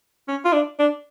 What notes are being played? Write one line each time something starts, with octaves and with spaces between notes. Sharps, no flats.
C#4
F4
D4
D4